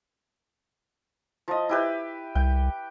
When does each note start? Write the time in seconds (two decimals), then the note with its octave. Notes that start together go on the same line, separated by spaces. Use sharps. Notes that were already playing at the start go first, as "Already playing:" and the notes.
1.48 F3 D#5
1.69 E4 G4 B4
2.35 C2 G5